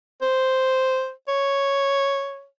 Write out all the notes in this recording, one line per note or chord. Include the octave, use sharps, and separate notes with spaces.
C5
C#5